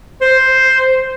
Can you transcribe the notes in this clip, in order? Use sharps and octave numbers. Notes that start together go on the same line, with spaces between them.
C5